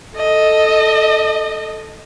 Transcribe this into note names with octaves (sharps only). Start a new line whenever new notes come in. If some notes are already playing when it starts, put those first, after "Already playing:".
A4 D#5